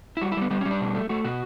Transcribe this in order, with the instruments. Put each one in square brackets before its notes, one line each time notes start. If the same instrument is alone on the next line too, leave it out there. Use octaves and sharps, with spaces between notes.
[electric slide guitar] E4
G3 F#4
E4
G3 B3
G3 B3
C#4
G3
D4
B2
A3
A3 F#4
B2 F#4